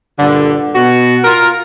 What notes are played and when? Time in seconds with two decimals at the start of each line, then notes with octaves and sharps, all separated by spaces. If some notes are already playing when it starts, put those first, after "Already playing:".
0.19 G2 A#2 D3
0.75 B2 F#4
1.24 F4 A#4